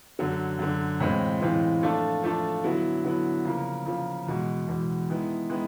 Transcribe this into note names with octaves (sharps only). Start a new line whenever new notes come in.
F#2 D3 F#3
F#2 D3 F#3
A2 E3 G#3 C4 F4
A2 E3 G#3 C4 F4
F3 A3 D4 F4 A4
F3 A3 D4 F4 A4
D3 F#3 B3 E4
D3 F#3 B3 E4
C#3 F3 A#3
C#3 F3 A#3
E2 B2 G#3
E2 B2 G#3
D#3 G#3 B3 E4
D#3 G#3 B3 E4